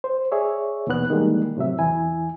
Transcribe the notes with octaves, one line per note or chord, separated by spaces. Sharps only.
C5
G#4 C#5 D5 E5
D#2 B2 E3 B3 F#6
D#3 E3 G3 G#3 A#3
A2 C3 F#3 E5
E2 E3 E4 G#5